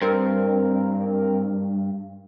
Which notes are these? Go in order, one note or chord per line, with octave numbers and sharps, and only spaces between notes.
G2 C4 A#4